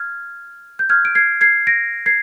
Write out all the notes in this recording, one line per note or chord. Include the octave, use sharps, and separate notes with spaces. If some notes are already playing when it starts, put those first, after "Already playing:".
Already playing: F6 G#6
G6
F6 G#6
D7
G#6 C7
G#6 C7
A#6 D7
G#6 C7